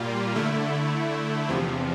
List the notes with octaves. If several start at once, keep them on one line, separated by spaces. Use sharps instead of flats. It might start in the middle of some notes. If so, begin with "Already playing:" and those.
Already playing: A#2 G3 A#3 F4
D3 A3 E4
E2 C3 F3